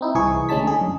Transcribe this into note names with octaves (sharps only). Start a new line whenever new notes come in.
C4 D#4 E4
C2 E3 G#4 C#6
D2 G#3 C#4 D#4 A5 B6
D3 G#4
F#2